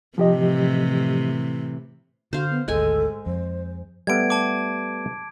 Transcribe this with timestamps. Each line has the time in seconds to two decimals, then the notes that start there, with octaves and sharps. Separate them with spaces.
0.18 A2 C3 E3 F3 G4 D#5
2.33 D3 F#4 C5 F5
2.50 B3
2.68 G#1 D2 G#3 A4 G#5
3.26 F2 C5
4.07 G3 A3 B3 G#6 D7
4.30 A5 D6